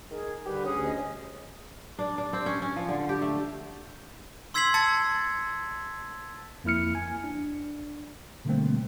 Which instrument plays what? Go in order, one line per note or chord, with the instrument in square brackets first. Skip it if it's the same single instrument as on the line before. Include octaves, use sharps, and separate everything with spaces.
[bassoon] D#3 [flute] G#4
[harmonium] D3 G3 [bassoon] G4 [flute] B4
[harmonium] D2 G#4 [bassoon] C#4 [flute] D#6
[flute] D#5
[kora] D4
D4
C4
C#4
C#4
F3
D3
G4
A3
[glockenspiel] C6 E6 G#6 B6 C7 F#7
A5 E6 G#6 A6 C#7
[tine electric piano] F2 A#3 E4 F6 C#7
G#5
D4
B2 D3 G3 A3 A#3 C4